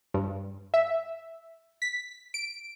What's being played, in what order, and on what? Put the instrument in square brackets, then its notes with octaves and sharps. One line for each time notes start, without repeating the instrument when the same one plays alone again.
[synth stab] G2
E5
B6
D7